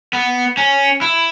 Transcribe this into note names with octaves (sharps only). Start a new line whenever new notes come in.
B3
C#4
E4